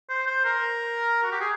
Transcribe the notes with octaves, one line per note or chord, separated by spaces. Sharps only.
C5
C5
A#4
F#4
G4
G#4